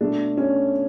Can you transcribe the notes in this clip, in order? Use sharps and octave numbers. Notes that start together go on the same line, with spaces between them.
B2 A3 D4
C#4